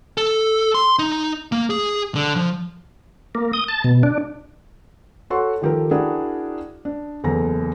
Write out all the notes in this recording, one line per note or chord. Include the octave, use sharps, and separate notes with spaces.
A4
C6
D#4
A#3
G#4
D3
F3
A#3
D#6
A5
B2
D4
F#4 A4 C#5 F#5 C6 C#6
D#3 F3 G4 A4 A#4
D4 E4 F#4 G#4 A#4 G5
D4
F#1 E2 A4 A#5 A#6